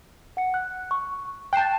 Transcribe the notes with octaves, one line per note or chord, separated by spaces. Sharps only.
F#5 C#7
F#6
C#6
G5 A5 F#6 C7 E7